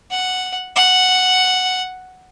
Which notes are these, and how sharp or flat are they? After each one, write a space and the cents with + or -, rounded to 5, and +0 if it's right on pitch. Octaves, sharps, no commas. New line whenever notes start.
F#5 +0
F#5 +0